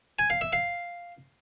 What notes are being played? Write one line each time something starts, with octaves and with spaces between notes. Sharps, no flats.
G#5
F5
E5
F5